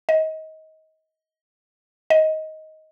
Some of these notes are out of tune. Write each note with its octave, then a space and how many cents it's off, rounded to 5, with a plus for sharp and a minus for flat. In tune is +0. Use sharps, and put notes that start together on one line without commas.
D#5 +25
D#5 +15